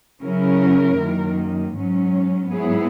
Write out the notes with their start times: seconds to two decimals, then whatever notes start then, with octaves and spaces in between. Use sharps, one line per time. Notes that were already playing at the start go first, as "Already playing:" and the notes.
0.23 C#3 F#3 C#4 E4 A#4
0.99 F#2 D#3 A#3
1.75 G#2 F#3 C#4
2.51 G#2 F#3 B3 E4 G#4